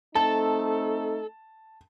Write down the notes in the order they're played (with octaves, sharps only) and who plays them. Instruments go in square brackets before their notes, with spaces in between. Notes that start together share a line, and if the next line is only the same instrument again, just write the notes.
[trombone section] A3 C4 D#4 [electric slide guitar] A4 [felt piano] A5